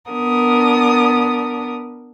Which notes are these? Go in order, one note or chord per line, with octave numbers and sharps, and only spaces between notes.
B3 D4 A#4 D#6